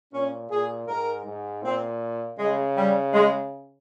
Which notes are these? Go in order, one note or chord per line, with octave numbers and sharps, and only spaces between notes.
A#2 C#4
A#2 G#4
G#2 A#4
G#2
A#2 C4
C#3 G#3
G3
G#3